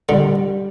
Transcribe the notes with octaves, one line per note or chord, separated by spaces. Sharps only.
D3 G3